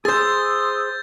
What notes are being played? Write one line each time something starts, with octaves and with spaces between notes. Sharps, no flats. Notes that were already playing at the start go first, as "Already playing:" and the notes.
G#4 C5 C6 D#6 E6 G6 A6